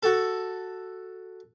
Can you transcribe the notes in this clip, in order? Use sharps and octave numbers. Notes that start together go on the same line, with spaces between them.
F#4 A4